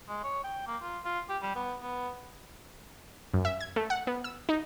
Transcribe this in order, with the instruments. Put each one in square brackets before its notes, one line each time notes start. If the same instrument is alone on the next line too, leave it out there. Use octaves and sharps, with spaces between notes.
[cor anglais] G#3
C#5
G5
A#3
F4
F4
G4
G3
B3
B3
[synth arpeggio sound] F#2
E5
G#6
A3
F#5
B3
E6
D#4